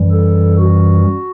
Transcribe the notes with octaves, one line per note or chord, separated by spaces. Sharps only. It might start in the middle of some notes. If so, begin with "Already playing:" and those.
Already playing: F#2 E3 G3
A4
F#4